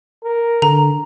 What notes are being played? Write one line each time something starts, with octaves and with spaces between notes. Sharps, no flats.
A#4
D3 A#5